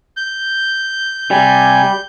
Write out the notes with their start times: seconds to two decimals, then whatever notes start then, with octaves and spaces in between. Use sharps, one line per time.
0.17 G6
1.31 C3 G3 G#5